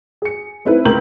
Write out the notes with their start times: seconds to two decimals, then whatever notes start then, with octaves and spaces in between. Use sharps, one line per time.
0.22 G#4 C#7
0.65 C4 D#4 E4 A4 B4
0.85 C#2 A#4 G6 F#7